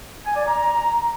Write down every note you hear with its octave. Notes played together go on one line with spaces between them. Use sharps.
G#5
D5
A#5